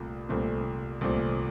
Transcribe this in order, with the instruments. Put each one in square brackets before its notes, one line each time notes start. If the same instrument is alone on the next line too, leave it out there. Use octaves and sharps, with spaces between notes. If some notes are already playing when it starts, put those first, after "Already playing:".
Already playing: [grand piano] C2 A#2 A3
C2 A#2 A3 C4
C2 A#2 A3 C4